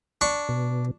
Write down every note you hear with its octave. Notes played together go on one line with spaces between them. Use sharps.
D4 C#6
B2